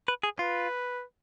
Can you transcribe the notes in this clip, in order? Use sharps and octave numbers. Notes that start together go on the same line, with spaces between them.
B4
G#4
F4 B4